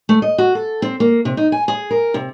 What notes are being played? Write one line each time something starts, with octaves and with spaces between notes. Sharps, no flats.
A3
D#5
F#4
A4
C4
A#3
C3
D#4
G#5
G#4
A#4
C3